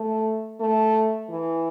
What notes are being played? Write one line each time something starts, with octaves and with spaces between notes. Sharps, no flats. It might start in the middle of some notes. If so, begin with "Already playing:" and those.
Already playing: A3
A3
E3